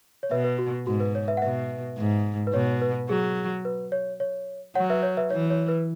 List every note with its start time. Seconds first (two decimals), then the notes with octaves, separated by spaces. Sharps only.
0.23 C#5
0.31 B2 B4 E5
0.44 B4
0.58 F#4
0.87 G#2 F#4
1.00 B4
1.15 C#5
1.28 B4 E5
1.37 F#5
1.42 B2 B4 E5
1.98 G#2
2.47 B4
2.53 B2 C#5
2.82 B4
3.09 F#3 G#4
3.65 B4
3.92 C#5
4.20 C#5
4.75 F#3 C#5 F#5
4.90 B4 E5
5.03 C#5
5.17 B4 E5
5.31 E3 C#5
5.50 C#5
5.68 B4